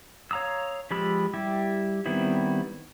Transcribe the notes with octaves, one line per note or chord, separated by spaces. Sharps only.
C#5 F5 A#5 D#6 E6
F3 G#3 G4 B5 E6
G3 E4 G4
D#3 G3 B3 C4 E4